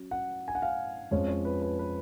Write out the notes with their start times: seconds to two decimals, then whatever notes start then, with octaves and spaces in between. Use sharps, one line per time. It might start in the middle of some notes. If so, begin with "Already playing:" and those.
Already playing: F#3 C#4
0.11 F#5
0.48 G#5
0.55 F#5
0.62 F5
1.11 F2 F3 G#3 C#4 F4 C#5
1.29 C#5
1.45 B4
1.62 B4
1.79 B4